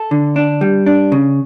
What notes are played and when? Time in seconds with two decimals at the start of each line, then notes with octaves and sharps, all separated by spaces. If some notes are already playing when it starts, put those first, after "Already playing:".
Already playing: A4
0.11 D3
0.36 D4
0.61 G3
0.86 D4
1.12 C#3